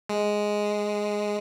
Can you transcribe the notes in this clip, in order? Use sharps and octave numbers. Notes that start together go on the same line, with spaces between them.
G#3